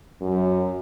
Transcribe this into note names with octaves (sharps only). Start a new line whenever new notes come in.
F#2